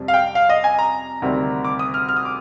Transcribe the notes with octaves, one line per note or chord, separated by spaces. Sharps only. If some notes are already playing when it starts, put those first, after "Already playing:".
Already playing: F2 C3 G3
F5
G5
F5
D#5
G#5
A#5
D2 C3 D#3 G3
D6
D#6
F6
F6
D#6
D6